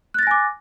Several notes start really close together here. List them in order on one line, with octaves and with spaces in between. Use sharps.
F#6 A6 A#6 G#5 D6